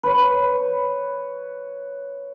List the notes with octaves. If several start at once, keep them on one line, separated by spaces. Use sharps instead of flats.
B4 C#5